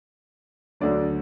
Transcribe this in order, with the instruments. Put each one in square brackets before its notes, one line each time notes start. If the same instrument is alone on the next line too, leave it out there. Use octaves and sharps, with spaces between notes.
[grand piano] D2 D3 F#3 D5